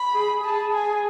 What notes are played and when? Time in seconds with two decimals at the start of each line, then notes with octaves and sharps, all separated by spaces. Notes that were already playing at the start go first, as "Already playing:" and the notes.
Already playing: B5
0.13 G#4
0.44 G#4 A5
0.72 G#5